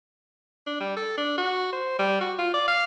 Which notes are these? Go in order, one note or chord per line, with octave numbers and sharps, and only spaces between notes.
D4
G3
A4
D4
F#4
C5
G3
F#4
F4
D5
F5